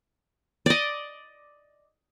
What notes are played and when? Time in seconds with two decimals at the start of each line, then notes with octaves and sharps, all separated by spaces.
0.66 D5 D#5